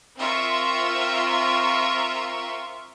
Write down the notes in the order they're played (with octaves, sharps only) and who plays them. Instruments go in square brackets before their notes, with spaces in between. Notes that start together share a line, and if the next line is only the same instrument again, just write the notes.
[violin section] C4 F4 A#4 E5 C#6